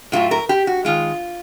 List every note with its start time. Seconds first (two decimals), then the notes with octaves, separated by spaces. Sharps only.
0.12 A2 F#3 A3 F4
0.31 A#4
0.49 G4
0.67 F#4
0.85 D#3 G#3 F4